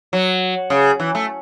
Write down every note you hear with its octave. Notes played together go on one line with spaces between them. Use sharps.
F#3
C#3
E3
A3